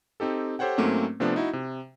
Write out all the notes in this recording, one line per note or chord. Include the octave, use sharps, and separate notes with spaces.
C4 D#4 G4 A4
G4 A4 C5 C#5 F#5 G5
G#2 F#3 A3 A#3 C4 C#4
C3 F3 A3 B3 D4
D#4 E4 F#4
C3